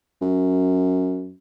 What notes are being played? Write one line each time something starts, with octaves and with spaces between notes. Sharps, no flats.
F#2